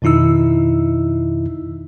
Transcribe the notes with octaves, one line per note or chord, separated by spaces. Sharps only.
F2 B2 D#3 D#4 E4 E6